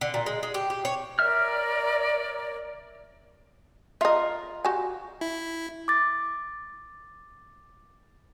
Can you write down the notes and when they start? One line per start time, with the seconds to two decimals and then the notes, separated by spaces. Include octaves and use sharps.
0.01 D3
0.14 A#2
0.26 G#3
0.43 G#3
0.54 G4
0.70 G4
0.85 C#5
1.19 A#4 C#5 D5 E5 F6
4.01 F4 A#4 D#5 E5
4.65 F#4 G4 G#5
5.21 E4
5.88 D6 A6